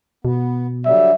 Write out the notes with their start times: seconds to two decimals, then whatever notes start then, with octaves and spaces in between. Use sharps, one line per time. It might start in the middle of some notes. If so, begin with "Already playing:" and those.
0.25 B2 B3
0.85 D3 F#3 G3 E5